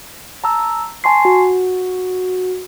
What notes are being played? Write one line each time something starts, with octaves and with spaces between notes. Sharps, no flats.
A5 A#5 E6
G#5 A5 C6 C#6 C7
F#4